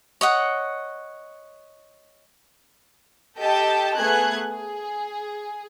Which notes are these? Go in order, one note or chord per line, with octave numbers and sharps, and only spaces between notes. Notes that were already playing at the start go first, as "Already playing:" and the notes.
C#5 D#5 F#5
G4 A4 D#5 G5 A5
A3 B3 G#4 F#6 G#6
G#4